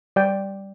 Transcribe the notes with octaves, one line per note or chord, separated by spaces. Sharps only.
G3 D5 G5